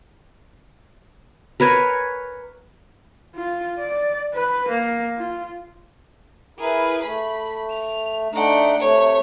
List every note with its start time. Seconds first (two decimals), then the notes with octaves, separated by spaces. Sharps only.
1.60 A#4 B4 C#5 G#5
3.34 F4
3.79 D5
4.34 B4
4.69 A#3
5.18 F4
6.59 E4 G#4 A#4 B4
7.03 A3 B5
7.71 F7
8.33 A3 D4 D#4 F#5 G5
8.79 C3 A3 C#5